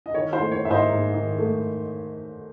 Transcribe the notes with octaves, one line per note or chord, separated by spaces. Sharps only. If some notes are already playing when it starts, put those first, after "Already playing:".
D#5
D#3 C#5
C5
A3
C#5
G#2 E5
C5 D#5
G#2
D#3
A3